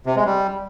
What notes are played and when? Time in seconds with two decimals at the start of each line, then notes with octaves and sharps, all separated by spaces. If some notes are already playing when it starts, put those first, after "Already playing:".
0.06 C3
0.16 G#3
0.26 G3